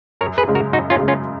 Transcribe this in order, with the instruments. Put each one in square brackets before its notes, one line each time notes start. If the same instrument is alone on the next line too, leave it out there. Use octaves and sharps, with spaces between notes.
[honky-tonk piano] F#2 [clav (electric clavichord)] A#4 C#5
[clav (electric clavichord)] G#4 B4
[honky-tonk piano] C#3 G#3
[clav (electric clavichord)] F#4 A#4
[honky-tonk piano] F#2 [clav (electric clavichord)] D#4 F#4
[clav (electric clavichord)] C#4 F4
[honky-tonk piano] C#3 G#3
[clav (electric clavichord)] C#4 F4